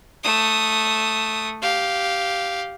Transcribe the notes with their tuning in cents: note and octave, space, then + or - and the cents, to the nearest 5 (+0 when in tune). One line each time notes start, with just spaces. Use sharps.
A3 +0 D#6 +0
G4 -10 F5 +0